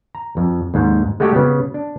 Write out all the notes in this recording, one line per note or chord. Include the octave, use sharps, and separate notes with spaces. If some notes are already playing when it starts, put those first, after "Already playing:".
A#5
F2
D#2 G#2
G#3 A3 F#4 G4
C#3 B3
D4